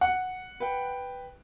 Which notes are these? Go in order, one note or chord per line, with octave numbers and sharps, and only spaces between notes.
F#5
B4 G5